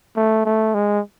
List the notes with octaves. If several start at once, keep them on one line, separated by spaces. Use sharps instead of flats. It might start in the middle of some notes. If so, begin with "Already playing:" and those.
A3
A3
G#3